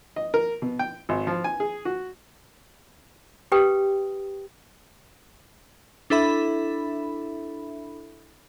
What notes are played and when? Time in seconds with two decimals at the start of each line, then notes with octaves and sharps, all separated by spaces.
0.16 D#5
0.34 A#4
0.62 B2
0.79 G5
1.09 G#1
1.27 F3
1.44 G#5
1.60 G#4
1.85 F#4
3.52 G4 B4 G5 D#6
6.10 D4 E4 A4 E5 B5